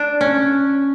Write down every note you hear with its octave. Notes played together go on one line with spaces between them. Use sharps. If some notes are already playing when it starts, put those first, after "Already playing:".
Already playing: D4
C#4